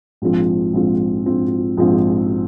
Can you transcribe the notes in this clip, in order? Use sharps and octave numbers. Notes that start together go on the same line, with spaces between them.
A#1 G#2 F3 C4 F4
A#1 G#2 F3 C4 F4
A#1 G#2 F3 C4 F4
A#1 G#2 F3 C4 F4